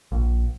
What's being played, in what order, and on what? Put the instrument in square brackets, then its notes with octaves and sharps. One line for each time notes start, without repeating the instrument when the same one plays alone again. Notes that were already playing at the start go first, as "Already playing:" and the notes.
[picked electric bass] A#1